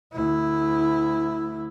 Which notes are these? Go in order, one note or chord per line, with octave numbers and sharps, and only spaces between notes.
D2 E4